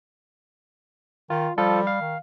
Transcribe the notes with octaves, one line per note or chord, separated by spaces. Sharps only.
D#3 F4
F3 G3 F4 A4
F5
D#3